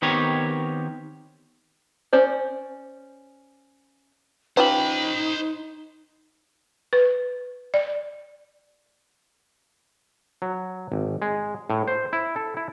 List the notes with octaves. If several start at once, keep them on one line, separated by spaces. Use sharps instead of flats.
D#3 B3 C4 G4 A#4 C#5
C#4 C5 D5
C#4 D#4 F4 G4 B4 C5 B5
B4
D5
F#3
G#1
G#3
A2
C5
E4
A4
E4